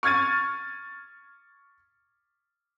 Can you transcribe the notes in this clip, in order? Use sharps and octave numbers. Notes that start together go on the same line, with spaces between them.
C#6 F6 G#6 A6 D#7